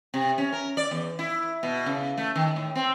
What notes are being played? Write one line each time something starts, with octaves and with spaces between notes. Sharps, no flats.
C3
C#4
A#4
D5
E2
E4
B2
C#3
A3
D#3
A2
C4